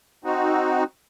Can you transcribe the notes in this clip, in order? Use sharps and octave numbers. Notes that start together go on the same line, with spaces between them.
C4 D#4 F#4